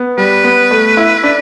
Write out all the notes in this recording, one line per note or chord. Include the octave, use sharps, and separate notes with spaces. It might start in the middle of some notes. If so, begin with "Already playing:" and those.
Already playing: B3
G3 B4
B3
A3
E4
D4